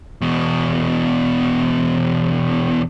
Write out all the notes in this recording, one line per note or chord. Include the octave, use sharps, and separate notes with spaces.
E2 B2